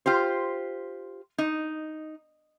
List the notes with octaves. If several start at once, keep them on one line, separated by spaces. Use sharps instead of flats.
F4 G4 C5
D#4